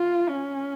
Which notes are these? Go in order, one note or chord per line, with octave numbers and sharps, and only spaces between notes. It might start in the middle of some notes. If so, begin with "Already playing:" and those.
Already playing: F4
C#4